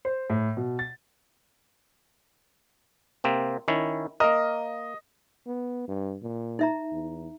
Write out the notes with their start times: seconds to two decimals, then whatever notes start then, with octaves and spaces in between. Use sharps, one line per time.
0.05 C5
0.30 A2
0.57 B2
0.79 A6
3.24 C3 A#3 C4
3.68 D#3 C#4 E4
4.20 A#3 A#4 D#5
5.46 B3
5.88 G2
6.22 A#2
6.59 D#4 E5 A#5
6.92 E2